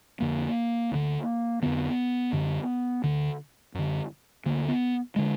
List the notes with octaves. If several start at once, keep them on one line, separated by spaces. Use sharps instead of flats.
F2 D3 A#3
D2 D3
F2 D3 B3
F#2 D3
D2 D3
F#2 D3
D2 D3 A#3
B3
D3 G#3